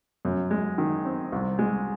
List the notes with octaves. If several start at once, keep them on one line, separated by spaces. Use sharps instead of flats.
F#2
G#3
D#3
C4
C2
G#3